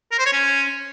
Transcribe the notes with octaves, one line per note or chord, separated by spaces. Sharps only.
A#4
C5
C#5
C#4